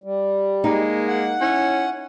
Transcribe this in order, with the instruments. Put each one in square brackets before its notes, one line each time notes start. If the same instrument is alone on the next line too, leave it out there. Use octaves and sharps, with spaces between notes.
[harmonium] G3
[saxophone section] G#3 A#3 [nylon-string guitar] D#4
[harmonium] F#5
[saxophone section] C#4 E4